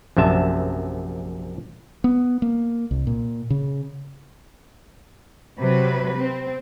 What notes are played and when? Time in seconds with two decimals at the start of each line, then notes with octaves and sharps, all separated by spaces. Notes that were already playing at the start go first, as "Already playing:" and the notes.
0.17 A#1 F#2 C3 E5 A5
2.04 B3
2.42 A#3
2.91 C2
3.07 A#2
3.50 C#3
5.60 C3 F#3 B4
6.16 C4